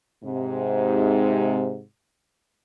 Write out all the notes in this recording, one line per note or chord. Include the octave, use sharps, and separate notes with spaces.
G#2 C3